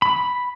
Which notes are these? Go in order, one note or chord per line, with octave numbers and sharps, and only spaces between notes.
B5